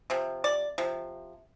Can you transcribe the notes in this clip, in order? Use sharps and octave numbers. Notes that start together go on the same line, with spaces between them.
C3 F3
D5
C3 F3